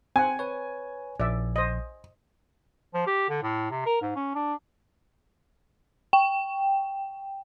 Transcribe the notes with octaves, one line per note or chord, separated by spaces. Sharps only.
C4 F#5 G#5
B4 C#5
A#1 D5 E5
C5 D#5
F3
G4
D3
A2
C3
A#4
G#2
C#4
D4
G5